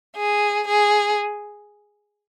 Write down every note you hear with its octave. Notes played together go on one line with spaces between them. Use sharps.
G#4
G#4